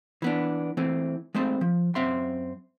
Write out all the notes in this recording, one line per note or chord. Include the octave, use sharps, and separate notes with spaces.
E3 B3 D4
E3 A3 C4
G#3 A3 C4 C5
F3
F#2 C4 E5 C6